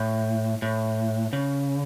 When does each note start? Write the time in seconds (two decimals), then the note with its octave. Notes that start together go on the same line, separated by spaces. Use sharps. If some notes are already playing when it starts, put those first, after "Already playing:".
Already playing: A2
0.62 A2
1.33 C#3